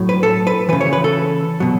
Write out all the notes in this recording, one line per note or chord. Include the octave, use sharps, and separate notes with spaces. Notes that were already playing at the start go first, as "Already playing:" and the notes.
Already playing: A2 F#3
B4
A4
B4
C#3 E3 B4
C#5
B4
A4
B2 F#3